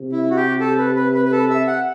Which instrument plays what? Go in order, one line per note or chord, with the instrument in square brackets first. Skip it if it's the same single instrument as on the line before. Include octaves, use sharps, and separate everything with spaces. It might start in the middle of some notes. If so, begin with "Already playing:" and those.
Already playing: [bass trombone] C3
[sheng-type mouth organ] E4
F#4
G4
A4
B4
B4
B4
B4
A4
E5
F#5